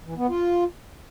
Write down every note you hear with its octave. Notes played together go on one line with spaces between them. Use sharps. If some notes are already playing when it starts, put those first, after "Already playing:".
E3
B3
F4